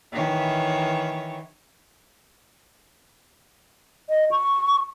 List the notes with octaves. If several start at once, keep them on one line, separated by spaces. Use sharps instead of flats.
D#3 E3 C#5
D#5
C#6